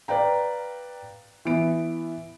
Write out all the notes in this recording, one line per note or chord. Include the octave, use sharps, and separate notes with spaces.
B4 D5 F5 G5 A#5
E3 B3 D7